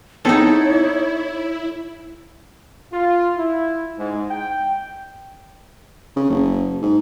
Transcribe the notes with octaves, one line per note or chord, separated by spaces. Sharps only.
B3 C4 D#4 E4 G#4 A4 C#5
F4
E4
G#2
G5
C#3
F#1
G#2